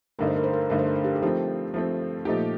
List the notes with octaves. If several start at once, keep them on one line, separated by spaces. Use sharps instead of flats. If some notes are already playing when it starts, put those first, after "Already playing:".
G2 D3 A3 D#4 A#4
C5
A#4
C5
A#4
C5
G2 D3 A3 D#4 A#4
C5
A#4
C5
G4 A#4
A4
F3 A3 C4 D#4 G4
F3 A3 C4
A#2 F3 A3 D#4 G4